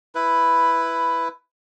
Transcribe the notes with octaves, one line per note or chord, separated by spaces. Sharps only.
E4 B4